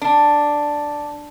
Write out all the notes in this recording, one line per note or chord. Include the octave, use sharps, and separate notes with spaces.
D4